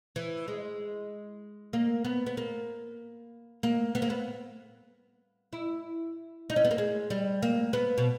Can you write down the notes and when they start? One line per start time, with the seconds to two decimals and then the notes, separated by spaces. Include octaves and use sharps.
0.16 E3
0.48 G#3
1.73 A#3
2.05 B3
2.26 B3
2.37 A#3
3.63 A#3
3.95 B3
4.02 A#3
4.10 B3
5.53 E4
6.50 D#4
6.56 C#4
6.64 B3
6.71 A#3
6.78 G#3
7.10 G3
7.42 A#3
7.73 B3
7.98 B2